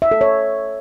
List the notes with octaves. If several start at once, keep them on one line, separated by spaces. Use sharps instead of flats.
E5
A4
C#5